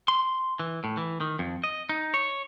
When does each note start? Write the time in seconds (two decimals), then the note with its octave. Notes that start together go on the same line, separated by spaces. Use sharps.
0.08 C6
0.59 E3
0.84 A2
0.97 E3
1.20 D#3
1.39 F2
1.64 D#5
1.89 D#4
2.14 C#5